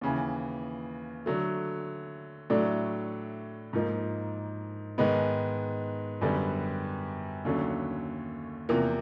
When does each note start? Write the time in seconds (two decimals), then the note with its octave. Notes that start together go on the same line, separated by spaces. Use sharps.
0.01 D#2 C#3 E3
1.26 D3 F#3 A3
2.50 A2 F#3 A3 D4
3.73 G#2 F3 A#3 D#4
4.98 G#2 D#3 G#3 B3
6.21 F#2 D3 G3 B3
7.45 D#2 D3 F#3 A3 C#4
8.69 E2 C3 F3 A#3